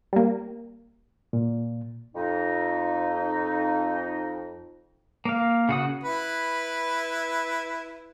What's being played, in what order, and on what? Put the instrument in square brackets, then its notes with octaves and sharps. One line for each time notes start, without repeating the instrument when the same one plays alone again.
[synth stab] G3 A#3
[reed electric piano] A#2
[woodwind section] F2 D#4
[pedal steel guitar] A#3 F5
C#3 F#4 D#6
[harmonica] E4 B4